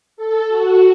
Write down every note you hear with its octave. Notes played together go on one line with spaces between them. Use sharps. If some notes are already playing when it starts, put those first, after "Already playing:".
A4
F#4